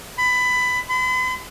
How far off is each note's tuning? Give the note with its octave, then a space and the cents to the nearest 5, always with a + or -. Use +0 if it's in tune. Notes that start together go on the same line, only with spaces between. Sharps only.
B5 +20
B5 +45